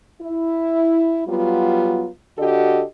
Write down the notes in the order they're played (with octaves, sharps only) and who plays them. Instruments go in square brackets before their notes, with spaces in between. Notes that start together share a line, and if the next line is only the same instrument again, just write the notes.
[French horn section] E4
F#3 G3 B3 F4
D3 F#4 G4 A4 D#5